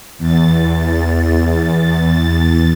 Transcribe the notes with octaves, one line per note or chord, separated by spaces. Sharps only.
E2 A6